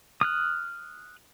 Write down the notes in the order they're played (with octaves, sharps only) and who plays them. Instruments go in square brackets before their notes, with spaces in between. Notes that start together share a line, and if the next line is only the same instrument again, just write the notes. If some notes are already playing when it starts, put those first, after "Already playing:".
[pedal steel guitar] D#6 F6 F#6